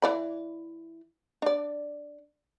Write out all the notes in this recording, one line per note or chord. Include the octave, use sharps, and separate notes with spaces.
E3 D5 B5
D4 D5